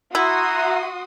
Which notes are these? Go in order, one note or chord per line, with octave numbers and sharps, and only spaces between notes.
E4 F#4 E5 F#5 A#5 C6 D#6